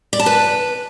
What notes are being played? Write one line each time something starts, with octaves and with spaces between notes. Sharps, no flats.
D5
A5
B4